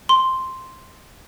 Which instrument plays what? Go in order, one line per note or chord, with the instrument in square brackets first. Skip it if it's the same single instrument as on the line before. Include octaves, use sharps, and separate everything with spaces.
[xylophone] C6